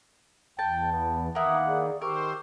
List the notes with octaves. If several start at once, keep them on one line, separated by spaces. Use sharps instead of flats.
E2 G5 A5
B3
D#3 A#3 E4 F#5 A#5 D#6 E6
G#4 D5
D#3 G4 A#4 C5 C#6 D6 E6